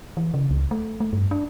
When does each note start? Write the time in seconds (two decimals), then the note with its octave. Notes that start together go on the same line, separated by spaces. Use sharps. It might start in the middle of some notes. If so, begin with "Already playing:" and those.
0.17 E3
0.34 C#3
0.51 C#2
0.71 A3
1.00 A3
1.13 G2
1.31 D4